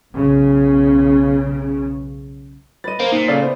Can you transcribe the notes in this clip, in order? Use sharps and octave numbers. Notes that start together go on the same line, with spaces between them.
B1 C#3
B4 D#5 A6 D#7
A#3 C5 F5
A#2 D#4
C#3 A4 D5 F5
B3 E4 C5